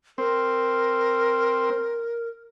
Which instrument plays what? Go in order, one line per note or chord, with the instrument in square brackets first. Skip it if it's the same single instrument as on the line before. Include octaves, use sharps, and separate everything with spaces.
[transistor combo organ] C4 [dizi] A#4